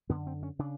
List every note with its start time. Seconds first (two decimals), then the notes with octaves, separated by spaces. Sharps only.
0.09 F#2 D3 B3
0.27 C4
0.43 C#4
0.59 C#3 D4